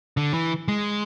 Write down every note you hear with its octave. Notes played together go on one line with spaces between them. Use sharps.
D3
E3
G#3